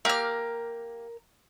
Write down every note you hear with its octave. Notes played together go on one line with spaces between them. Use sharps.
A#3 G4 A#4 F6